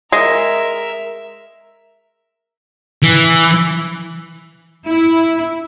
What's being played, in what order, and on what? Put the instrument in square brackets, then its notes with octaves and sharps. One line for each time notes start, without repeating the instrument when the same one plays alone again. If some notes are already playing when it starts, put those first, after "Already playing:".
[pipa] G#3 [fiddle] A#4 E5
[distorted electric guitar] E3
[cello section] E4